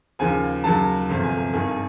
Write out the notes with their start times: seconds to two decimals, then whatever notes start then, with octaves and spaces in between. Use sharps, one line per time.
0.19 D#2 C#3 F3 G#5
0.64 D#2 C#3 F#3 A5
1.09 G1 F2 C3 F3
1.24 G#5
1.38 G#5
1.54 G#1 G2 D#3 G#5
1.69 G#5